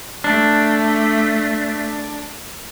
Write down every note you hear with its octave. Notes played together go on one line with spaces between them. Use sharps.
A3 D4